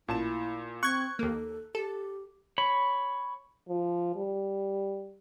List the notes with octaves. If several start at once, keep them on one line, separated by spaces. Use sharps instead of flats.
A1 A#2 E4 A5 E7
C4 C#6 F#6 G#6
D#2 A#3 A4
G4 A4
C#5 B5
F3
G3